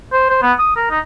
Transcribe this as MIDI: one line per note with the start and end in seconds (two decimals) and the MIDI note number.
0.12 0.28 72
0.30 0.40 72
0.42 0.52 59
0.59 0.76 87
0.76 0.89 70
0.90 0.99 63